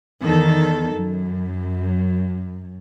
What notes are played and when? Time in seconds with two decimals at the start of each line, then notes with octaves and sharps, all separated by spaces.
0.22 E2 D#3 A4
0.94 F#2